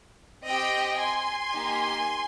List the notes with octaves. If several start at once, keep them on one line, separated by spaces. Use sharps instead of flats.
C4 G4 D#5 G5
G#5 C6
A#3 D#4 G4